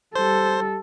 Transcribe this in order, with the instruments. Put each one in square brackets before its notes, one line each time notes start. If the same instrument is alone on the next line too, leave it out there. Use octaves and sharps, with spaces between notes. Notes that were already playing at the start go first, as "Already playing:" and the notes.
[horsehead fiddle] G3 A4 [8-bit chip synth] C5